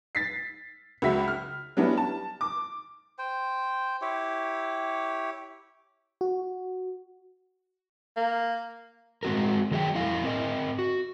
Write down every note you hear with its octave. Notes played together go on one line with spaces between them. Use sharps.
A6 B6 C7
C#2 F#2 F#4 E5 B6
F6
F#3 G3 B3 C#4 D4 E4
A5
D6
C5 G5
E4 G4 C#5
F#4
A#3
G#3 C4 F#4 A#4
D#3 F#3 G#4 D5 G5
F2 E4 F5 G#5
C4 A#4 D#5
F#4